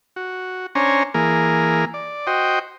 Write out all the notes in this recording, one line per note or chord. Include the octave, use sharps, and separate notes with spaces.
F#4
C#4 D4 C5 C#5 G#5 A#5
E3 A#3 G#4 A#4
D5
F#4 C5 D#5 G5